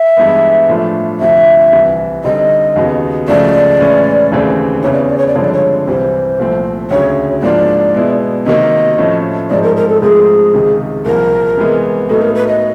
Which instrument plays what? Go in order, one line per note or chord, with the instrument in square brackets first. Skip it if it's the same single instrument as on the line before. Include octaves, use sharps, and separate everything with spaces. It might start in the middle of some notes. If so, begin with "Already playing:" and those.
Already playing: [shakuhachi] E5
[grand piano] G2 E3 G#3 B3
A2 F3 A3 D4 F4
[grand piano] D2 C3 F3 [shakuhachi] E5
[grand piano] C2 C3 E3
[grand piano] D3 G3 C4 D#4 [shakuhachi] D#5
[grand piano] D#2 C#3 F#3 B3 D#4
[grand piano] C#2 C#3 F3 A3 [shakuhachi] D5
[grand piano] A2 E3 G#3 C#4
D#2 C#3 E3 A3 C4
[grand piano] E2 C#3 E3 [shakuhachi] C#5
[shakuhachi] D5
C#5
D5
C#5
D5
[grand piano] G2 D3 F3 G#3 C4 [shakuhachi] C#5
[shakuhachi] D5
C#5
[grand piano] C2 C3 E3 G3 [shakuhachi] C5
[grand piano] C2 A#2 F3 A3 C4
[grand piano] D2 C#3 F#3 [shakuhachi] C#5
[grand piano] G#2 F3 A#3 D4 F4 [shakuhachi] D5
[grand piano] B2 G#3 B3 E4
[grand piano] C3 D#3 F#3 A#3 D#4 [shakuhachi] D#5
[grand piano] A2 F3 A3 C#4
[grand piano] G#2 F3 G#3 C4 D#4 [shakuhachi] D5
[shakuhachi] A#4
A#4
A4
[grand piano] G#2 F3 A3 C4 F4 [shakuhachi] G#4
[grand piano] C#2 C3 D#3
[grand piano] C2 A#2 F3 A#3 [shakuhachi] A#4
[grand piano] C3 E3 G#3 B3
[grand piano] A2 F#3 B3 D#4 [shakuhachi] A4
[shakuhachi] A#4
B4
D#5